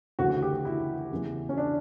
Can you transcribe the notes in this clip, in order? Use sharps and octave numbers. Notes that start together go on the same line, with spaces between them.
D2 C#3 E3 F#4
G4
E4
E2 C#3 E3
C#4
D4